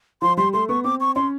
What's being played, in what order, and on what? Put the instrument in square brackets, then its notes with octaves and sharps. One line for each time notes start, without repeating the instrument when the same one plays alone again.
[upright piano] F3 [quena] C6
[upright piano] G3 [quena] C6
[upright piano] A3 [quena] C6
[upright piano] B3 [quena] C#6
[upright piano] C4 [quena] D6
[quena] C#6
[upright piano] C#4 [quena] C6